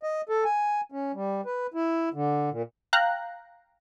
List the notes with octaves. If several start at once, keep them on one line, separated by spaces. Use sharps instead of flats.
D#5
A4
G#5
C#4
G3
B4
E4
D3
A#2
F5 G5 A#5 F#6